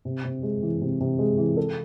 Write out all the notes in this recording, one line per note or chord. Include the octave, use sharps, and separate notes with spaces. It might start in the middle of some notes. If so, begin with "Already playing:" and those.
C3
C3
G#3
E3
C3
C3
G#3
E3
A4